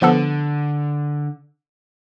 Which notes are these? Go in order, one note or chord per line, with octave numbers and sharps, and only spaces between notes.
D3 F3 B3 A4